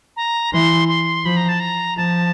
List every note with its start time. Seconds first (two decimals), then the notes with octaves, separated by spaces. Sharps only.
0.16 A#5
0.53 E3 C6
0.88 C6
1.25 F3 B5
1.37 A#5
1.49 A5
1.60 A#5
1.97 F3 A5